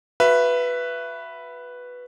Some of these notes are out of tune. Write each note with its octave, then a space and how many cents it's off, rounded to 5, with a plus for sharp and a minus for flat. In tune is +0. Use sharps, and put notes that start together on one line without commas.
F#4 +0 B4 +0 E5 +25